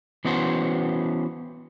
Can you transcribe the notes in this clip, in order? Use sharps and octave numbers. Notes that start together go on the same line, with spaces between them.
E3 B3 C#4 F#4 C5